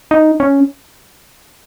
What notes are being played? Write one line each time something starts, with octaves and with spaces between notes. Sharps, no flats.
D#4
C#4